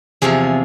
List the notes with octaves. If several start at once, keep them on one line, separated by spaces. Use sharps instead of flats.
E2 C3 F3 G#4